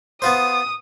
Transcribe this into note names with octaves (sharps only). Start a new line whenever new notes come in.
B3 F4 C5 D#6